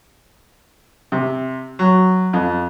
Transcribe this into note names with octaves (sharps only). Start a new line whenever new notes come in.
C3
F#3
F2